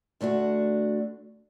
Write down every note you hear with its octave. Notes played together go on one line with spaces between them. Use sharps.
D3 A3 D4 F#4